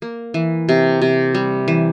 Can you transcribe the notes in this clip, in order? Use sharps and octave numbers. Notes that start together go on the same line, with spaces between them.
A#3
E3
C3
C3
G3
E3